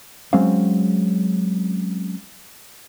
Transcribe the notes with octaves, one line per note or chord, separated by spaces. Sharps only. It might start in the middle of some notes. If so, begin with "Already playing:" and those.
F#3 G#3 C4 C#4 F5